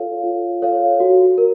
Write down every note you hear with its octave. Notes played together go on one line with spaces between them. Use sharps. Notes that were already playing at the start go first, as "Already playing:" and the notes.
Already playing: F4 A4 C#5 F5
F4
A4 C#5 F5
F#4
A#4